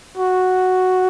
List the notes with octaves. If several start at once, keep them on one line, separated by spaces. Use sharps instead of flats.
F#4